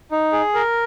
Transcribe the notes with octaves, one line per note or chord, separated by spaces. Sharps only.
D#4
G#4
A#4